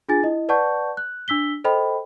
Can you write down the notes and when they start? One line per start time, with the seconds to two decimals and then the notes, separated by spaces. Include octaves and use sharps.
0.09 D4 F4 G#4 G#5 A6
0.23 E4 D#5
0.49 B4 D5 F#5 A5 C#6 G6
0.97 F#6
1.28 D4 E6 B6 G7
1.64 A4 C5 D#5 G5 B5